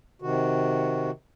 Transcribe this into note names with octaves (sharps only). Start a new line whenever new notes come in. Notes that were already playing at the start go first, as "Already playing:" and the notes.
C3 D#3 F#4